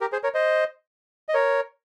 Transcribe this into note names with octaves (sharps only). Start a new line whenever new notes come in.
G4 A#4
G#4 C5
A#4 C#5
C5 D#5
D#5
A#4 C#5